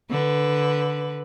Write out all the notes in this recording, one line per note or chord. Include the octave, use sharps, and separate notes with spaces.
D3 B4